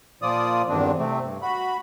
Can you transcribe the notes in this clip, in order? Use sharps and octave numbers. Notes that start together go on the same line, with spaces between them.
A#2 F3 F4 D5 D#6
E2 G2 D#3 C4 D4
C3 A3 C4
G2
F#4 B5